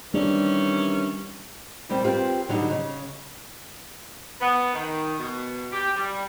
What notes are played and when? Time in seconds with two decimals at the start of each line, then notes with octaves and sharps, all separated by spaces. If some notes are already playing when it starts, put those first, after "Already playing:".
0.14 D#3 E3 G3 C#4 D4
1.89 A#2 G3 C4
2.04 C4 F4 G4 A#4 B4
2.48 B2 D3 F#3 G3 D#4
2.71 C#3
4.41 B3
4.73 D#3
5.18 B2
5.72 G4
5.96 G3